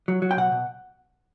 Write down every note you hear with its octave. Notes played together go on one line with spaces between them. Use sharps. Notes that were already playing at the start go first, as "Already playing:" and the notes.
F#3
F#3
G5
B2 F#5
B2